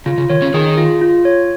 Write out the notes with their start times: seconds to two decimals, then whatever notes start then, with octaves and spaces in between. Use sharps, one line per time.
0.06 C#3 F4
0.18 C#3
0.29 D#3 C#5
0.42 C#3 C#4
0.54 D#3 D#4 G#4
0.78 F4
1.01 F4
1.25 C#5